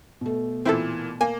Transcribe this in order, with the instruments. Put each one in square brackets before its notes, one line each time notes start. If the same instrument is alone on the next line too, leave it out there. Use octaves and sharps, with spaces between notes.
[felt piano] B2 A3
[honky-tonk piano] A#2 E3 [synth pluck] C4 E4 A4
[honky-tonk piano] A#3 [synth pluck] G#5